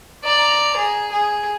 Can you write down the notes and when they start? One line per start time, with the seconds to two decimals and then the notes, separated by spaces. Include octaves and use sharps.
0.24 D5 A#5
0.76 G#4
1.12 G#4